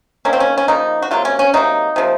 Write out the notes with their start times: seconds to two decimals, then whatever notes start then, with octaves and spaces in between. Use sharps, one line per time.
0.25 D#3 F#3 A#3 C#4
0.33 C4
0.40 C#4
0.58 C#4
0.68 C#3 F3 A#3 D#4
1.02 F#4
1.11 C3 F#3 A#3 F4
1.25 C#4
1.39 C#4
1.53 C3 F#3 A#3 D#4
1.96 C3 F3 A#3